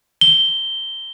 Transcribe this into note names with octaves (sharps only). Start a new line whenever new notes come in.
G7